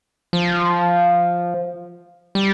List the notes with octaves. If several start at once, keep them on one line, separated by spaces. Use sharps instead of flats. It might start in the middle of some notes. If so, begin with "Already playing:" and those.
F3
G3